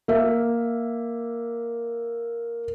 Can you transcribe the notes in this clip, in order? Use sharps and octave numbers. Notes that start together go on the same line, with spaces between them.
A#3 E5